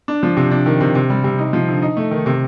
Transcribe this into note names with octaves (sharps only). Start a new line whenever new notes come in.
D4
F3
C3
D4
D#3
C3
C3
G3
C3
D#4
F3
D3
D#4
A3
D#3
C3